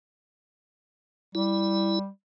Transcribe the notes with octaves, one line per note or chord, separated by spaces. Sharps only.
G3 E4